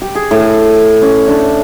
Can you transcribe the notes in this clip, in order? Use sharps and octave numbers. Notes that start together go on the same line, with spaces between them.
G4
G#4
A2
C#4
D4